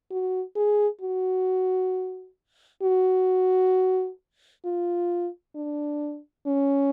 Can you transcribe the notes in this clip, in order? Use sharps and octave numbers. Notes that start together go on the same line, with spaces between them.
F#4
G#4
F#4
F#4
F4
D4
C#4